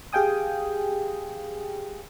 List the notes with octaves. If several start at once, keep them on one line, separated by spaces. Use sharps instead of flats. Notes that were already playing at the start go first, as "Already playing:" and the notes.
G4 G#4 F5 G5 G#5 D#6